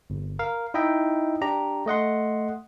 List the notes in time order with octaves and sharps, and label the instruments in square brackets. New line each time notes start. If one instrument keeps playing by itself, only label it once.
[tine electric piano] G1
A#4 F5
D#4 E4 D#5 E5 G5
D4 G4 A#5
A3 D#5 F#5 C6